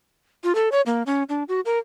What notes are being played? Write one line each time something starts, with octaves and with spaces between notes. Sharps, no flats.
F4
A4
C#5
A#3
C#4
D4
F#4
A#4